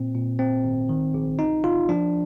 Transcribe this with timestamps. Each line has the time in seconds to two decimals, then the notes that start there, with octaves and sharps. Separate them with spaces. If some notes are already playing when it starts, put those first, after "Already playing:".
Already playing: A#2 C4
0.15 A#2
0.39 G#1 C4
0.64 G#1
0.89 D#3
1.14 A#1
1.39 G1 D#4
1.64 G1 F4
1.89 F3 D4